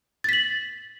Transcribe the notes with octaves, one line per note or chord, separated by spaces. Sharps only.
A6 B6 F#7